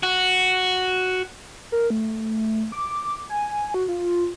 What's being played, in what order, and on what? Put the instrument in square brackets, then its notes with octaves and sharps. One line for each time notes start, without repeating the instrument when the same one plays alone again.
[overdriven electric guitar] F#4
[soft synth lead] A#4
A3
D6
G#5
F#4
F4